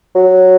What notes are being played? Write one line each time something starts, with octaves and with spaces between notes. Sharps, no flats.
F#3